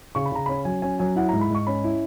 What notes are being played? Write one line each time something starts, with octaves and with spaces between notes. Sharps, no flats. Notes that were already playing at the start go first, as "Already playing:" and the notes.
C#3 C#6
B5
C#3 A#5
C#4 B5
F#3 G#5
C#4 G#5
F#3 G#5
E4 F#5
A#5
G#2
B5
G#2 C#6
C#4 B5
E4